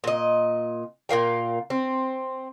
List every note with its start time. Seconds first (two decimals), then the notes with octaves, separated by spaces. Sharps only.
0.04 A#2 D#5
1.09 A#2 A#4 F5 G5
1.70 C4